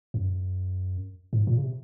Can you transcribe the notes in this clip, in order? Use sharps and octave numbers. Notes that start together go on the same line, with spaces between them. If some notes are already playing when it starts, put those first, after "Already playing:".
F#2
G#2
A#2
C#3
C3